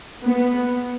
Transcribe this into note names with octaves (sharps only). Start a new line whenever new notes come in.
B3